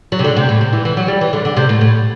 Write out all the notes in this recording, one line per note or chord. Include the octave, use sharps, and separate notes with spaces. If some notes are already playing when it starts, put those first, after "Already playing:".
F#3
C3
D3
C3
A2
C3
E3
E3
F#3
G3
E3
D3
D3
C3
A2
A2